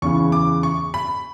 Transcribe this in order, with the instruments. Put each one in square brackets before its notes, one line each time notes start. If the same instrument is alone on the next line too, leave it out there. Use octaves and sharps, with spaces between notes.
[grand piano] E2 C#3 E3 [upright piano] C#6
[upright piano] D6
C#6
B5